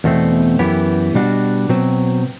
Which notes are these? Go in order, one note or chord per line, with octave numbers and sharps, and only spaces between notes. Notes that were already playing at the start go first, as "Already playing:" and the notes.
E2 B2 A3 C4
F#2 E3 B3 E4 G4
B2 G3 D4 F#4
B2 F#3 C4